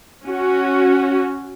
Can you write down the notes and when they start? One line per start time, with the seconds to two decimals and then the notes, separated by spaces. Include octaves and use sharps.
0.24 C#4 F#4